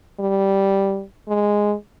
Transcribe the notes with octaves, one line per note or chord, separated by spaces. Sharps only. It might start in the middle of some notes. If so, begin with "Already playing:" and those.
G3
G#3